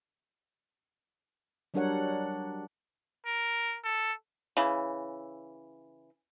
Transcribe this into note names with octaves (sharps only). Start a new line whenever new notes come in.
F#3 G3 D4 A#4 C#5 F#5
A#4
A4
C#3 E3